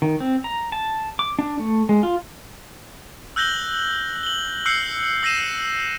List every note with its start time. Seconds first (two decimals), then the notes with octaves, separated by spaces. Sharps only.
0.02 D#3
0.20 C4
0.44 A#5
0.72 A5
1.19 D6
1.39 D4
1.59 A3
1.89 G#3
2.03 F4
3.36 E6 F#6 G6 A#6 F#7 G7
4.23 F#7 G7
4.66 E6 F#6 G6 C7 C#7
5.23 E6 A#6 C7 D#7 E7